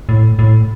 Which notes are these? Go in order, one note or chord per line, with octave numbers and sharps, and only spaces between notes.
A2
A2